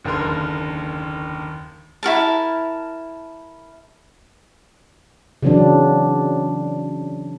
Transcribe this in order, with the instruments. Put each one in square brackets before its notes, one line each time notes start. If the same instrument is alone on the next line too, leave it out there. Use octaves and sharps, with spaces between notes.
[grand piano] F#1 D#2 D3 A#4 C6
[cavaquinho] E4 F#4 A#4 A5
[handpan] C#3 E3 F#3 C4 D4